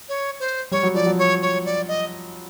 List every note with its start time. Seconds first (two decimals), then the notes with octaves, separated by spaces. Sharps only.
0.09 C#5
0.40 C5
0.71 G3 C#5
0.83 F#3
0.94 F3 D5
1.06 F#3
1.18 C#5
1.42 C#5
1.65 D5
1.88 D#5